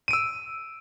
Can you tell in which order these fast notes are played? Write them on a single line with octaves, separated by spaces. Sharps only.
D#7 D7 E6